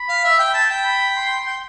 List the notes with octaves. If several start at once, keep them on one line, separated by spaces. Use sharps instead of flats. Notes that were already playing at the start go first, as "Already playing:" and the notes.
Already playing: B5
F5
E5
G5
A5
G5
B5
C6
G5